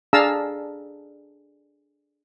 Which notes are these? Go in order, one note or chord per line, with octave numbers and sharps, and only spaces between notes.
D4 G#4 F5 A5 A#5 E6